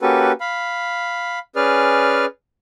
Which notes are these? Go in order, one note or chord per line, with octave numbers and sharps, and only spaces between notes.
A#3 C#4 F#4 G4 A4 B4
F5 B5
C#4 G#4 B4 D5 F6